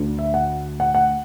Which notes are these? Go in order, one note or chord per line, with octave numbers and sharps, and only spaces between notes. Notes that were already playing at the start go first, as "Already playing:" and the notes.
Already playing: D2 D3
E5
F#5
F#5
F#5